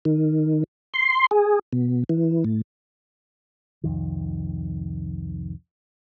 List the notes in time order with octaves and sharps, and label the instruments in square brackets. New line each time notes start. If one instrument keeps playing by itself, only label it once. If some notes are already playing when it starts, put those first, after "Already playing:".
[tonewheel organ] D#3
C6
G#4
B2
E3
A2
[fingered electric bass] C2 F2 D#3